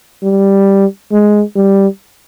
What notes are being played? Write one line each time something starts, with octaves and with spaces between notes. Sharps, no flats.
G3
G#3
G3